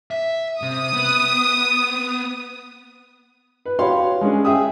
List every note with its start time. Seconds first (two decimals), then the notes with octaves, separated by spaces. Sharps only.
0.11 E5
0.62 C3 D#6
0.94 B3
3.66 B4
3.79 F#4 G4 C#5 F5 B5 C6
4.21 G#3 C#4 D4 G#4
4.45 G#4 E5 G5 D#6